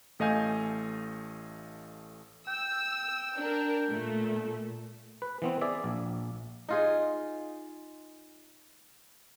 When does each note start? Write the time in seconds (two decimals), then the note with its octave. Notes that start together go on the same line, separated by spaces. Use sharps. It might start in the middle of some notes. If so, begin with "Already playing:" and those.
0.19 A1 A3 D#5 F5 G#5 G6
2.48 G5 E6
3.36 D4 A#4
3.89 A#2 A3
5.22 B4
5.42 E3 B3 C4
5.61 G#4 D5 E5
5.84 A#1
6.69 D#4 F4 G#4